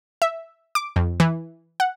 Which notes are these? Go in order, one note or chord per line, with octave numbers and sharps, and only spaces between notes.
E5
D6
F2
E3
F#5